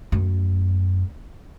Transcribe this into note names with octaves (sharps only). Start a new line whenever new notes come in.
F#2 A3